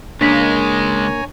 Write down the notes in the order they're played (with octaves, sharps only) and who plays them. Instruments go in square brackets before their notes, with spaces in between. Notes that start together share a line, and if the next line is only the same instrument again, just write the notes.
[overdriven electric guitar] C#2 G#3 [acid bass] A#3 [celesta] D4 B6 [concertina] C#5 G#5 A#5